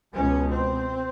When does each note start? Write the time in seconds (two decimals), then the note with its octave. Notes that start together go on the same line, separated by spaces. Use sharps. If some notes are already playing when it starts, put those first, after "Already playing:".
0.14 C#2 B2 C#4
0.50 C4